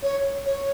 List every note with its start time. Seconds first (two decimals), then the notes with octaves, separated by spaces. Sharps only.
0.03 C#5
0.46 C#5